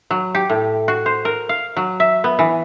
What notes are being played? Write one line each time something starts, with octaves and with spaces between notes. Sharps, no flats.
F#3
G4
A2
F#4
C5
A#4
F5
F#3
E5
B3
E3